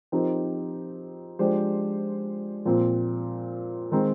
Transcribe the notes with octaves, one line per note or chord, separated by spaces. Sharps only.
F3 C4 D#4 G4 A#4
F3 G#3 D4 G4 C5
A#2 F3 C4
D#3 G#3 C4 D#4